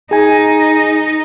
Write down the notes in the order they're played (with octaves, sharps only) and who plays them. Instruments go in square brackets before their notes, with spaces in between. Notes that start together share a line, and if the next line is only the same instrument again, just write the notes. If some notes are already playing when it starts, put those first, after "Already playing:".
[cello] D#4 [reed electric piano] G#4 G#5